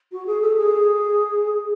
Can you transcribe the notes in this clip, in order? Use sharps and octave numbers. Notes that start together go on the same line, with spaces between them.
F#4
G#4
A4
G#4